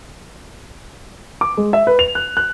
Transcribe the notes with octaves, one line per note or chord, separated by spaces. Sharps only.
D6
G#3
E5
B4
F7
F#6
F#6